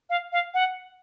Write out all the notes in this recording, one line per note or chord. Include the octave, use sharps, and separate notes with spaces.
F5
F5
F#5